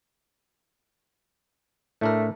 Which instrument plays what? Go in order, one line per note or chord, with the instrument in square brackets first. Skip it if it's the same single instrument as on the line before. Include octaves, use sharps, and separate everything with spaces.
[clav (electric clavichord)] A2 D4 A#4 [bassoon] A3